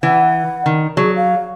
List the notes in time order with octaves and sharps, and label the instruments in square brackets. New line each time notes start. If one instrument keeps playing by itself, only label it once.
[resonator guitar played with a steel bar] E3 [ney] F#5
[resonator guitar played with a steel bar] D#3
[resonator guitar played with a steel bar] F#3 [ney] G#4
[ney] F5